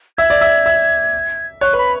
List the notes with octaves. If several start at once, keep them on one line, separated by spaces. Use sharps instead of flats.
E5 G#6
D5
E5
E5
C#5 F#6
B4 B5